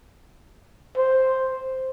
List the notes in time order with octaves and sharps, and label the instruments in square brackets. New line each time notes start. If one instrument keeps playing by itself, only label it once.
[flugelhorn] C5